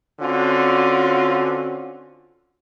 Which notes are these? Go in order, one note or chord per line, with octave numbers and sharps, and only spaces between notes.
D3 C4 C#4 F4 F#4